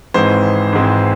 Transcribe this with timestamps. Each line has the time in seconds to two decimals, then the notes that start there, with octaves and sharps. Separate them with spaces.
0.14 G#1 G#2 E3 G#3 C4 C5
0.73 G#1 G#2 E3 G#3 C4